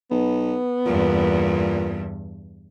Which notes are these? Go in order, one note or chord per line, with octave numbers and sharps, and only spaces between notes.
B1 B3
E2 G2 A#2